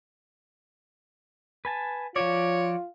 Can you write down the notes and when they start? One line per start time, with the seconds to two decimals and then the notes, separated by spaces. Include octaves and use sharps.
1.65 B4 G#5 A5
2.16 F3 F4 F#4 C#5 D5